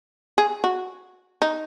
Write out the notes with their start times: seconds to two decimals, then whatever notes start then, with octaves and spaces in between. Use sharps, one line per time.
0.38 G#4
0.64 F#4
1.42 D#4